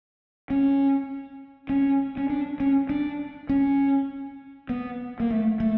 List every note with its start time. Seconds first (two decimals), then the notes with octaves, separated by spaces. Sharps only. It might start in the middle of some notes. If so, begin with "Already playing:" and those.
0.50 C#4
1.69 C#4
2.17 C#4
2.30 D4
2.60 C#4
2.89 D4
3.49 C#4
4.69 B3
5.20 A#3
5.31 A3
5.60 A3